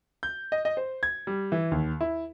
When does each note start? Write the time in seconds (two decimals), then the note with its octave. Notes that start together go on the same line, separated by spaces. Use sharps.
0.23 G6
0.52 D#5
0.65 D#5
0.77 C5
1.03 G#6
1.27 G3
1.52 E3
1.72 D#2
2.01 E4